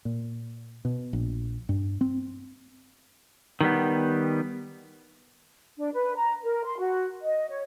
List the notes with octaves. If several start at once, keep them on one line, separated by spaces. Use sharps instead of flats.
A#2
B2
A#1
G2
C4
D#3 G3 B3
D4
B4
A#5
A#4
C6
F#4
D#5
C#5